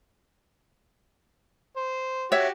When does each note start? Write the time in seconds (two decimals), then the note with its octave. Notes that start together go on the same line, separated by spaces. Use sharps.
1.77 C5
2.32 F#4 G4 C#5 E5